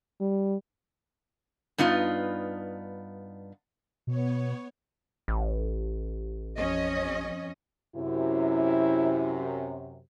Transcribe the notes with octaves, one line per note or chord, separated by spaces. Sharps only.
G3
G2 B3 D#4 F4
B2 B3 C#5
A1
F2 C#4 D#5
F#2 C3 E4